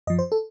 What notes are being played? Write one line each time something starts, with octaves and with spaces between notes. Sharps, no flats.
F#2 F3 D#5
C5
A4